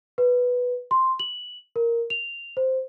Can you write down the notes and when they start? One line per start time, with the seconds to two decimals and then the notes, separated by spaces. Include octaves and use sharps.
0.18 B4
0.91 C6
1.19 F#7
1.76 A#4
2.10 F7
2.57 C5